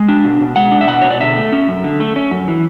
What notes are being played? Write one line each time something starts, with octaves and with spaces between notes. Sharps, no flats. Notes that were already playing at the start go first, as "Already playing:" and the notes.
Already playing: G#3
D4
B2
B2
G#3 F#5
D4
E5
B2 F#5
B2 C#5
D5
D3 E5
A3
C#4
F#2
D3
A3
C#4
F#2
E3